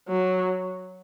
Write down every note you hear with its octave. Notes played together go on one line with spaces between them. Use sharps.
F#3